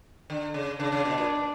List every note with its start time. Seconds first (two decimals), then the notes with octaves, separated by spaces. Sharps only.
0.30 D3
0.54 C#3
0.80 C#3 D4
0.92 C#3
1.05 B2
1.18 A#2